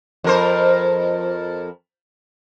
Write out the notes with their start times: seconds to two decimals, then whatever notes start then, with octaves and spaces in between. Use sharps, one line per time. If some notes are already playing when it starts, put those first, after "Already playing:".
0.24 F2 A#4 C5